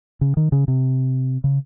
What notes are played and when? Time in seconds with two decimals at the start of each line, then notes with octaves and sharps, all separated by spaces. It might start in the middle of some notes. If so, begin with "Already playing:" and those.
0.21 C#3
0.37 D#3
0.52 C#3
0.68 C3
1.44 C#3